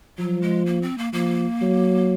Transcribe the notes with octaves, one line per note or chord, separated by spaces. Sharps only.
F3 F#3
G#3
A#3
C4
A#3
F3 A#3
F#3